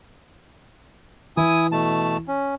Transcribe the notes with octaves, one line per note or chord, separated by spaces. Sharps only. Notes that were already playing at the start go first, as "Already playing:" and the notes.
E3 E4 G#5 D#6
B2 A3 A5
C#4